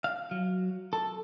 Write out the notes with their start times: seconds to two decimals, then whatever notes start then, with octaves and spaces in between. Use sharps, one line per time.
0.04 F5
0.31 F#3
0.93 A4